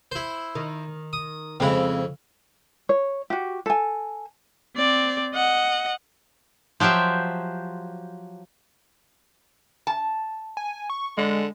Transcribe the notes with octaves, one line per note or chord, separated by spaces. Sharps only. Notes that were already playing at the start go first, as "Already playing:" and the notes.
E4 C5
D#3
D#6
F2 C#3 G#3 C4 E4
C#5
F#4 G4
A4 G#5
C4 D5
D#5 F#5
F3 F#3 G4 C5 E5
A5
G#5
C#6
D3 G#3